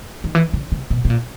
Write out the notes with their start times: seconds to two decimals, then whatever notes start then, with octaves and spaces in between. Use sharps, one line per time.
0.24 D#3
0.35 E3
0.53 C#3
0.72 C3
0.90 B2
1.05 B2
1.10 A#2